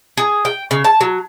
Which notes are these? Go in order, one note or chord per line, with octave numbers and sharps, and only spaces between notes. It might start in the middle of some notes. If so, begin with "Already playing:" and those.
G#4
G5
C#3
A5
F#3